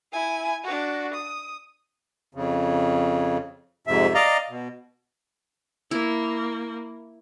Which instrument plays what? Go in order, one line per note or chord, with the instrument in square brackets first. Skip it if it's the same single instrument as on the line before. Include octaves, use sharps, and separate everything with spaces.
[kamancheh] E4 G#5
D4 F#4
D#6
[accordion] F2 C#3
F2 G#2 C3 E5
D5 D#5 F5 A#5
B2
[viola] A#3 [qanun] E4